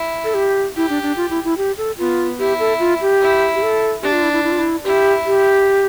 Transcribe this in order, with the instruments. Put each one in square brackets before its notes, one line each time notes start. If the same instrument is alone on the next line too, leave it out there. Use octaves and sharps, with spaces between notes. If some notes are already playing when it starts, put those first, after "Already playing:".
Already playing: [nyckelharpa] E4
[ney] A4
G4
[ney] E4 [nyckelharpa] G4
[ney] D4
D4
F4
E4
E4
G4
A4
[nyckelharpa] B3 [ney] F4
[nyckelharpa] E4 [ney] G4
[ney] A4
F4
G4
[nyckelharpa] E4
[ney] G4
A4
[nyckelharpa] D4 [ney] G4
[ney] F4
E4
E4
E4
F4
E4
[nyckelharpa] E4 [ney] G4
[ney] G4